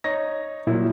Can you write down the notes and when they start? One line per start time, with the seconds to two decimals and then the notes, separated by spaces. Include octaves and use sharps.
0.04 D#4 C#5 A#6
0.67 A#2 F3 F#3 E4